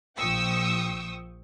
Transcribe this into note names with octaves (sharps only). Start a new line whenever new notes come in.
A#1 F3 G5 C#6 D#6 E6